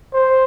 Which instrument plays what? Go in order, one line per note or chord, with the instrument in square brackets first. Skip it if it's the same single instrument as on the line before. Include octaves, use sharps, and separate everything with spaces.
[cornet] C5